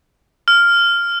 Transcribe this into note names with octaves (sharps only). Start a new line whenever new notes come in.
F6